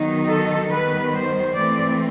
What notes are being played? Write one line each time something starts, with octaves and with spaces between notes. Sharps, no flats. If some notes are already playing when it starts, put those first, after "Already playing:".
Already playing: D#3 F#3 B3 D#4
A4
D#3 G3 B3 B4
C5
E3 A3 C4 D5